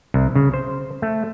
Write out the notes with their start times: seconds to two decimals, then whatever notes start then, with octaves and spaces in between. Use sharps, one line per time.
0.14 C2
0.35 C#3
0.54 C5
1.02 A3